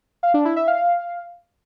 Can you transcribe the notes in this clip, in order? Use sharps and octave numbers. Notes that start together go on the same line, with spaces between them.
F5
D4
E4
E5
F5